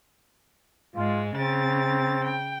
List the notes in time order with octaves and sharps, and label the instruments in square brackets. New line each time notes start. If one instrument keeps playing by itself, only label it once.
[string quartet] G#2 G#3 [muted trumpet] F4
[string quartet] C#3 A6 [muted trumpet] C4
[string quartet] G5